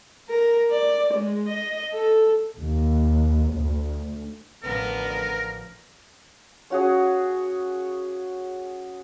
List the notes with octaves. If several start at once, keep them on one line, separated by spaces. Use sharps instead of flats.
A#4
D5
G#3
D#5
A4
D#2
D2
A1 D3 F3 B3 A#4
C#4 F#4 G#4